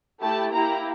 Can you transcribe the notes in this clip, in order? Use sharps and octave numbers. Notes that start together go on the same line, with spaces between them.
A3 E4 G4 A5
A#3 E4 G4 A#5